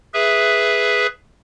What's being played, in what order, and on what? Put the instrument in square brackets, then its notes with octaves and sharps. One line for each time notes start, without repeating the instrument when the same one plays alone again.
[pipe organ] G#4 B4 E5